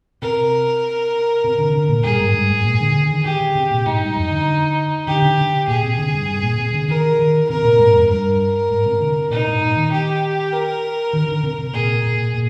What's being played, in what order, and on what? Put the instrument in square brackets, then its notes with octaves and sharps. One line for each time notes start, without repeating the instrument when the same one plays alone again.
[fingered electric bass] C3 [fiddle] A#4
[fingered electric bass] C3
D3
D3
A#2
[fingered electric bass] G2 [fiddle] G#4
[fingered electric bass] G#2
G2
G#2
A#2
D3
D3
D#3
[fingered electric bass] D#3 [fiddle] G4
[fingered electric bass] D3
C3
A#2
[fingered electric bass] G#2 [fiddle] D#4
[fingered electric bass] G2
F2
D3
[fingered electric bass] D3 [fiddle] G4
[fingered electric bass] D3
D3
[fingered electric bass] A#2 [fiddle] G#4
[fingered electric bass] C3
D3
G2
G2
A#2
C3
D3
[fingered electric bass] D#3 [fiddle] A#4
[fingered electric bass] D#3
[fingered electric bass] C3 [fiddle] A#4
[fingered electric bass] C3
A#2
G#2
F2
[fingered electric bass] G2 [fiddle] A#4
[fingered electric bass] G#2
C3
D3
C3
[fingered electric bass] A#2 [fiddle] D#4
[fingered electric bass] G#2
A#2
D#3
[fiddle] G4
A#4
[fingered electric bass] D#3
D3
C3
C3
[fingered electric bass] A#2 [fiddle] G#4
[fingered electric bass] A#2
A#2